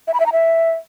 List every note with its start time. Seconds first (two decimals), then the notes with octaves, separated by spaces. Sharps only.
0.07 E5
0.14 B5
0.20 E5
0.26 A#5
0.32 E5